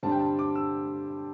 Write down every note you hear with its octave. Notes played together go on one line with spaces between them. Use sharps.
G2 D3 G3 C4 A5
G5
A5
D6
E6